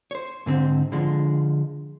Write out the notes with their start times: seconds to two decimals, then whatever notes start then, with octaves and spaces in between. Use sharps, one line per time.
0.11 C5 C#5
0.46 G#2 D3 C4
0.92 D3 F3 G#3